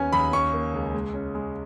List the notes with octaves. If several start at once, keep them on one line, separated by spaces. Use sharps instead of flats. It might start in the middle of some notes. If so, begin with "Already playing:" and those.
Already playing: D#2 B3 C#4 G#5
D#2 B5
C#4 C#6
A#3
C#2
G#3
C#4
G#3